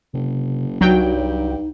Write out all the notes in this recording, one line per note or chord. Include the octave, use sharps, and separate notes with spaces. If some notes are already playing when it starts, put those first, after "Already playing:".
F#1 C3
C2 G2 F#3 D#4 G5